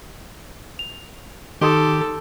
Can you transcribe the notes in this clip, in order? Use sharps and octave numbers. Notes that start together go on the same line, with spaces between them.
F7
D#3 D#4 G4 A4 C6 D#6